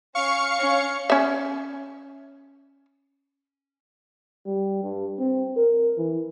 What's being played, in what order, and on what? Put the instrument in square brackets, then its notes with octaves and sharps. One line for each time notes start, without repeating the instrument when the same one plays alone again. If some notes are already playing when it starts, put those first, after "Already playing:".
[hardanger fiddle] C#4 [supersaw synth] F5 C#6 C#7
[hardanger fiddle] C#4
[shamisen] C#4 E5
[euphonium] G3
G2
C4
A#4
E3